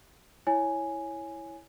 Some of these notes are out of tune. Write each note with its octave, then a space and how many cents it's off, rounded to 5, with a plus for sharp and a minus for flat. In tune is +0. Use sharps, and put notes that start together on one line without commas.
E4 +0 C#5 +0 G#5 +0